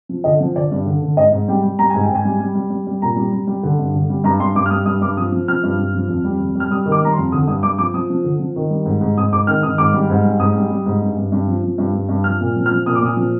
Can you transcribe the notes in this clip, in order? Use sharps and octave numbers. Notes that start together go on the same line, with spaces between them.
F3
D3 D#5
F3
D3 D5
G2
D3
D3
G#2 D#5
G#2
G3 G5
G3
G3 A#5
G#2 G#5
G5
G#2
G#5
G3
G3
G3
G3
G3
A#2 A#5
G3
G3
G3
D3
G2
D3
G3
G2 A#5
G2 C6
G2 D6
F6
G3 D#6
G2 D#6
G2 D6
F3 D#6
F3
F3 F6
G2
G2
F3
F2
G3
F2
G3
F6
G3 D#6
D#3
D6
G3 A#5
C6
F2
D3 D#6
G2 D#6
G2 D6
F3 D6
F3 D#6
F3
D3
F3
D#3
G3
G#2
G#2
G#2 D#6
G#2 D6
D#3 F6
D#3 D#6
G#2 D6
G3
G#2
G3
G#2 D#6
G3
G3
G#2
G2
G2
G2
F3
F3
G2
G2
G2
F3 F6
A#2
F3
F6
F3
A#2 D#6
D6
A#2 D#6
F3